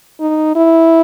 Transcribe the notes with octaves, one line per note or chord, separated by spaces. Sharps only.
D#4
E4